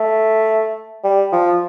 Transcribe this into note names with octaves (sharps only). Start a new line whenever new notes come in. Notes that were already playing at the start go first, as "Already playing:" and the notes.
Already playing: A3
G3
F3